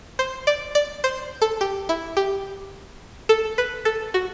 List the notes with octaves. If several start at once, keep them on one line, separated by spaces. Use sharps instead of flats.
C5
D5
D5
C5
A4
G4
E4
G4
A4
B4
A4
F#4